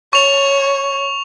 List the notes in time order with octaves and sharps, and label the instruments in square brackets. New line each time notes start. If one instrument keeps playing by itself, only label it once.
[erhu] C#5 [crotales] C#6 F7